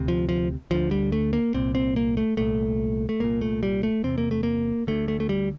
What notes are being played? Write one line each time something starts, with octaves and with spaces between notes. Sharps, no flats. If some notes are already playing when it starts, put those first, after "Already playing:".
Already playing: D2 C3
F3
F3
D2 D3 F3
G3
A3
A#3
C2 A#2 C4
C4
A#3
A3
C2 A#2 A3
A3
C2 A#2 A#3
A3
G3
A3
E2 C3 C4
A#3
A3
A#3
D2 D3 A3
A3
A3
G3